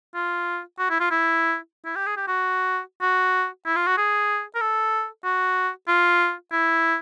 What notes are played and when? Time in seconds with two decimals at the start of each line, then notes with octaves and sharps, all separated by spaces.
0.15 F4
0.79 F#4
0.90 E4
1.00 F4
1.11 E4
1.85 E4
1.96 G4
2.06 G#4
2.17 G4
2.28 F#4
3.01 F#4
3.66 E4
3.76 F4
3.87 F#4
3.97 G#4
4.55 A#4
4.61 A4
5.24 F#4
5.88 F4
6.52 E4